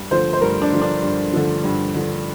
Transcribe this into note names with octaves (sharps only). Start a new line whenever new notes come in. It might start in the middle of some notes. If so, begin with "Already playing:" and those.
Already playing: G2
D3 F3 C5
C5
G2 A#4
D4
D3 F3
D4
G2
D3 F3
G2
D3 F3